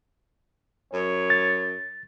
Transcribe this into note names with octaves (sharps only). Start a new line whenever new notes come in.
F#2 C#5
A6